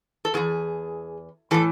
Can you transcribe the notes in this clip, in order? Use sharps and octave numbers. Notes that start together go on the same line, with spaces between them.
A4
E2 B2 G#4
A2 E3 A4